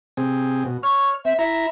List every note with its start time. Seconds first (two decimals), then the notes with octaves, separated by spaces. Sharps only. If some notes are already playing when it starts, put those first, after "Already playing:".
0.17 C3 C4 G#4
0.66 B2
0.83 C#5 C#6 F6
1.25 C4 E5
1.39 E4 E5 A#5